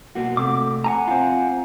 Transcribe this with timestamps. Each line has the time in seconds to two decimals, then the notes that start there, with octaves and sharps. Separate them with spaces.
0.15 B1 A#3 F#4
0.37 C3 A3 D6
0.84 F#5 G#5 A#5
1.07 C4 F4